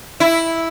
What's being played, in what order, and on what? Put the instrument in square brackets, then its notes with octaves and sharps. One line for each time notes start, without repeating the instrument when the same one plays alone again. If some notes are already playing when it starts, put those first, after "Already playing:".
[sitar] E4